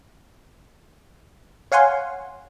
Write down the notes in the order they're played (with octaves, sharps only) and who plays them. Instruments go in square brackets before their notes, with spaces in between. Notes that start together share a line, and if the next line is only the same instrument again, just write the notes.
[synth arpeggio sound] C#5 F5 F#5 G#5 C6